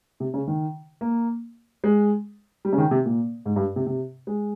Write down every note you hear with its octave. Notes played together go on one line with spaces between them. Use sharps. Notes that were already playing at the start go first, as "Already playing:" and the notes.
C3
C#3
D#3
A#3
G#3
G3
C#3
D#3
C3
A#2
G#2
G2
C3
C3
G#3